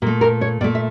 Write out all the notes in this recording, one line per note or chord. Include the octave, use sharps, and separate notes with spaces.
A#2 A3 A#4
A#4
C#5
A#2 A3 D5
E5